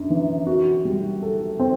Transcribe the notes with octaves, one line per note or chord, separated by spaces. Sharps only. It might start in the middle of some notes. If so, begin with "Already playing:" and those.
Already playing: F#2 D4
E3
F#4
G3
A4
C4